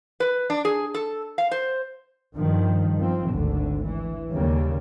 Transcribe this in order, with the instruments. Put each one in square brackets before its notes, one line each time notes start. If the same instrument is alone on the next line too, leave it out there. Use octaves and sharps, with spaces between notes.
[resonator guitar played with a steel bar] B4
D4
G#4
A4
F5
C5
[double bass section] G2 D#3 F3
F3 C4
G#1 D2 D3
E3
D#2 C#3 G3 A#3